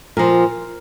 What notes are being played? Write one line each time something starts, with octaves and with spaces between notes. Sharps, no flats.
A#2 F3 A#4